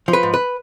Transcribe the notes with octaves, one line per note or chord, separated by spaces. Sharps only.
F3
B4
G#2
B4